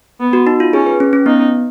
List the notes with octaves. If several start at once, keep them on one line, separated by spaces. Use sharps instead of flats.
B3
F#4
D#4
F4
C#4 G#4
B4
C#4
C#4
B3 D#4